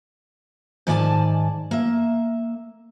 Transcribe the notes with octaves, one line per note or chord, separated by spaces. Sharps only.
G#2 D#3 D5 E5 G#5 A5
A#3 E5